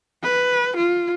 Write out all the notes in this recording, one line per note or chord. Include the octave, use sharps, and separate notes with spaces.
B4
F4